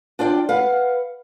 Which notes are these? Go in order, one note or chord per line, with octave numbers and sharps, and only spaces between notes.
D4 F4 D5 G5
B4 F5 F#5